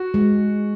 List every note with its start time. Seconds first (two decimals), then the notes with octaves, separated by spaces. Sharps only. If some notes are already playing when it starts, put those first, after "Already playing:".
Already playing: F#4
0.14 G#3